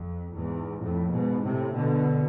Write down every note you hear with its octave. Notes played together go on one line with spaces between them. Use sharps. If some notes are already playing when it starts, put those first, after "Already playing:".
Already playing: F2
E2 G#2
F2 A2
G#2 B2
A2 C3
B2 D3